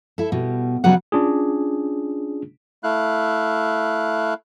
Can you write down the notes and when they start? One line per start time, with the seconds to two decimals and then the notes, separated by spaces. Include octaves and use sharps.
0.18 E4 A4
0.32 B2 G3
0.84 C#3 F#3 G3 B3 D#5 F#5
1.12 C#4 D4 F4 G#4
2.84 A3 E4 F5 F#6